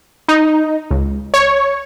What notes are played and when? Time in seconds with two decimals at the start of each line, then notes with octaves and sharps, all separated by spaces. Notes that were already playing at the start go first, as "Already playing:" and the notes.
0.28 D#4
0.90 C#2
1.34 C#5